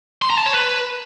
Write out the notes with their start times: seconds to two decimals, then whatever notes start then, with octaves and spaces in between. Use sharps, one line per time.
0.22 C6
0.30 A#5
0.38 A5
0.46 C#5
0.54 B4